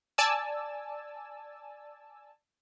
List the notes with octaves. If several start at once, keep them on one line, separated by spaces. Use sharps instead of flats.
D5 G#5 A5 E6